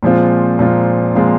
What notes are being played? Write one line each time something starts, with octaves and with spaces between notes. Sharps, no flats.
A#2 F3 G#3 C4 F4
A#2 F3 G#3 C4 F4
A#2 F3 G#3 C4 F4